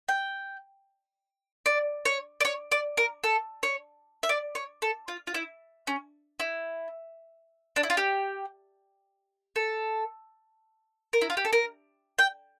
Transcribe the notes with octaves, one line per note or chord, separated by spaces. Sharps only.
G5
D5
C#5
D5
C#5
D5
A#4
A4
C#5
E5
D5
C#5
A4
F4
F4
E4
C#4
E4
D4
E4
F4
G4
A4
A#4
E4
F4
G4
A4
A#4
G5